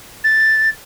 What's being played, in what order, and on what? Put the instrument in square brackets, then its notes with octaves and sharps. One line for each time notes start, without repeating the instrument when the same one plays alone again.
[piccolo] A6